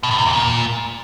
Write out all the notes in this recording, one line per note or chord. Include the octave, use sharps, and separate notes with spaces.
B2
A2
C3
E2
A#2